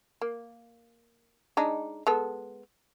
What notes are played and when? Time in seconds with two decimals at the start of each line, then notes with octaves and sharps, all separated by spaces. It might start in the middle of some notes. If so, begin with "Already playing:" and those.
0.21 A#3
1.57 G#3 D4 D#4
2.07 G#3 B3 A4